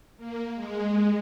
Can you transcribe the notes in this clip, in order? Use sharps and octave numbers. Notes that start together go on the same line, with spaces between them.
A#3
G#3